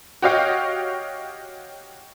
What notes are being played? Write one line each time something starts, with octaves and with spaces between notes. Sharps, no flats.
F#4 G4 C#5 D#5 F5 G5